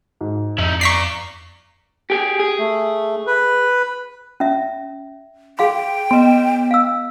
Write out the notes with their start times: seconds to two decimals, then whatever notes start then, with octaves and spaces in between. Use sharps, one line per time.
0.21 G#2
0.58 F2 D#4 E4 F#7
0.81 D5 A#5 C#6 B6 C7
2.10 G4 G#4
2.39 G#4
2.59 A3
3.27 B4
4.40 C#4 E5
5.59 G#4 F5 G5 C6
6.11 B3 D#5 C6
6.71 F5 E6